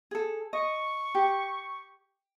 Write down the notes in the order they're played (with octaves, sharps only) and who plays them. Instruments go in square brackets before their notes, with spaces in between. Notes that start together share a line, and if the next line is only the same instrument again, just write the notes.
[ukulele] G#4 A4
[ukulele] D#5 [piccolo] C#6
[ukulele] G4